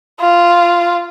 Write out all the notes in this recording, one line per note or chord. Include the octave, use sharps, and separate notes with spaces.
F4